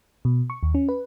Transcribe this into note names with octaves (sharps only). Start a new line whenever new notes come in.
B2
C#6
D#2
C#4
B4